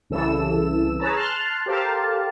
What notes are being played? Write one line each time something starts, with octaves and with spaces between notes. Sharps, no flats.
C2 C#3 E3 A4 E6 E7
G#4 B4 C#5 A5 A#5 E6
A5 C6 F6 F#6
G4 A4 A#4 C5 F5 A5